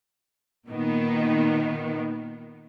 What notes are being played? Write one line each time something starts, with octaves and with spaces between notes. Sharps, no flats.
A#2 D#3 B3